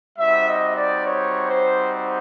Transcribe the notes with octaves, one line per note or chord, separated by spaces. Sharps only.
G3 C4 D#4 F#4 E5
D#5
D5
C#5
C5